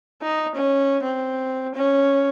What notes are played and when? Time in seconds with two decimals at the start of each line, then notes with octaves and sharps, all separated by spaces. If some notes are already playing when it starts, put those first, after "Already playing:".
0.22 D#4
0.55 C#4
1.03 C4
1.74 C#4